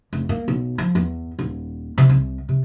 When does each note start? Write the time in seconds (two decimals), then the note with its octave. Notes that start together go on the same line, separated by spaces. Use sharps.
0.13 F1
0.29 A#3
0.48 B1
0.78 F3
0.95 E2
1.39 D#1
1.98 C3
2.09 C2
2.49 C3